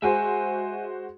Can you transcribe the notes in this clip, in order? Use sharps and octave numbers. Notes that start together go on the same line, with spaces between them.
G#3 F#4 C5 E5 G#5